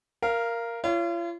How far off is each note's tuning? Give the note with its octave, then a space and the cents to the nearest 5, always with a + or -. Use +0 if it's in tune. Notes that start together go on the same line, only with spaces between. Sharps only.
A#4 +0 F5 -20
F4 -40 C#5 +15